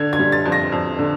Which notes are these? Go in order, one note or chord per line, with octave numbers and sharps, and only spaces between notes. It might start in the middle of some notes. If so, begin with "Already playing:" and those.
Already playing: D3 G#6
G#6
G3
A6
F2
A#6
F2
D3